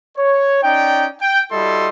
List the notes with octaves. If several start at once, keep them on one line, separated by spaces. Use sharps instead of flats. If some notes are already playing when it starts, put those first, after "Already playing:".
C#5
C#4 D#4 D5 G5
G5
G3 E4 F#4 A4 D#5 C6